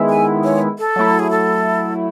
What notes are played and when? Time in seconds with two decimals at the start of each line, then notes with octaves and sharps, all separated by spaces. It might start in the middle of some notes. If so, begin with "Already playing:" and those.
Already playing: D#3 G#3 B3 E4
0.09 G#5
0.44 C#5
0.79 A4
0.96 F#3 A3 E4
1.19 G#4
1.31 A4